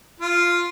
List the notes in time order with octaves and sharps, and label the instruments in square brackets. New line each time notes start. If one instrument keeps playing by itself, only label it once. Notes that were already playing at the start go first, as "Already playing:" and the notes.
[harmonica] F4